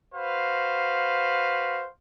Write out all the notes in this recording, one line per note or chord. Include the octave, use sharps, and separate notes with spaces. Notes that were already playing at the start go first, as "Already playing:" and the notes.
F#4 B4 C5 F5